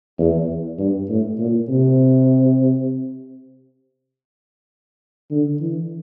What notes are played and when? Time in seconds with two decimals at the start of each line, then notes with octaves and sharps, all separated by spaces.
0.19 E2
0.78 G2
1.09 A2
1.38 A#2
1.69 C3
5.31 D3
5.61 E3